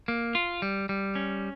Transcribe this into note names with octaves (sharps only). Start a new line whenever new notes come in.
A#3
F4
G3
G3
C#4